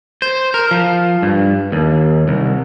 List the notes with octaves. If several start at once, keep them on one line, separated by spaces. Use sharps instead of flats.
C5
A#4
F3
G2
D#2
C2